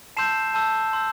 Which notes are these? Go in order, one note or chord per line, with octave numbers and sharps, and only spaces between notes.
A5 C6 E6 G6 C7 E7
A5 C6 E6 G6
C6 E6 G6